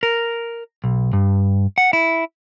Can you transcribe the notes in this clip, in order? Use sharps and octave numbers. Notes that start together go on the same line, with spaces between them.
A#4
B1
G2
F#5
E4